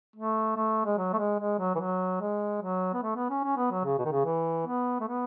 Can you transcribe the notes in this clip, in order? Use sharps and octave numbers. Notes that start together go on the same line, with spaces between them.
A3
A3
G#3
F#3
A3
G#3
G#3
F#3
E3
F#3
G#3
F#3
B3
A3
B3
C#4
C#4
B3
F#3
C#3
B2
D#3
C#3
E3
B3
A3
B3